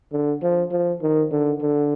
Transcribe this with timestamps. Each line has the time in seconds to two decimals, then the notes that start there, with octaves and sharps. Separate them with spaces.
0.12 D3
0.43 F3
0.72 F3
1.02 D#3
1.31 D3
1.61 D3